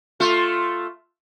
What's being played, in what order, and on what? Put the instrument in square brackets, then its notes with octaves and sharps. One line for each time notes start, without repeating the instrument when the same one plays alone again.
[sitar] A3 F4